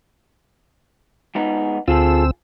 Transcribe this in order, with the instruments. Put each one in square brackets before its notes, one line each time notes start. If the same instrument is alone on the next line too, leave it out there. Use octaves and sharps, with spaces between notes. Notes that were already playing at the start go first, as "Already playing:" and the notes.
[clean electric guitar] G#2 B3 D#4
[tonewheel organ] D2 C4 E6 [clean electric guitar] F4 G#4 A4